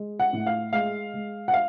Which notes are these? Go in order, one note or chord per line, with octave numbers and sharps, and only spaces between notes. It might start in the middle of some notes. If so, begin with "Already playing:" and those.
Already playing: G#3
F#5
A2
F5
G#3 F5
G#3
F#5
F5